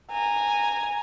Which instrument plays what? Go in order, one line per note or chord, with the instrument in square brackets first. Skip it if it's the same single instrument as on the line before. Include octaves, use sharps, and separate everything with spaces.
[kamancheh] G#5 A#5